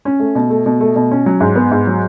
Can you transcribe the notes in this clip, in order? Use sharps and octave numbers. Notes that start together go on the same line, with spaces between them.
C#4
A3
B2
A3
B2
A3
B2
C#4
F#3
G#2
B3
G#2
F#3